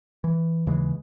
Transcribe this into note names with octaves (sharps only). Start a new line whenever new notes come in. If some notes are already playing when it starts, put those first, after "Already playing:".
E3
D#2 C#3 E3 G#3